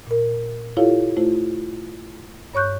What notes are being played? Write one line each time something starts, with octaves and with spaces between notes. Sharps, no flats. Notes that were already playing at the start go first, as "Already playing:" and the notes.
A#2 A#4
E4 F4 G4 A4 C#5 F5
A3 E4 F4 C5
G2 C#5 C#6 F#6 G6